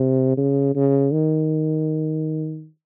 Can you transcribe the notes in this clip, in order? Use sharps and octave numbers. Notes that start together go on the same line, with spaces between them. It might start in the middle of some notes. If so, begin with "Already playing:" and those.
Already playing: C3
C#3
C#3
D#3